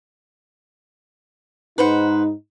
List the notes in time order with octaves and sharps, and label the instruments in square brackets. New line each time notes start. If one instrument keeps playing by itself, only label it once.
[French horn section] G#2 D#4 [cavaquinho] B4 C5 F#5